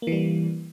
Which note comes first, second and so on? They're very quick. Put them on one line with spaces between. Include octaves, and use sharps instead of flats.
A#3 E3 G3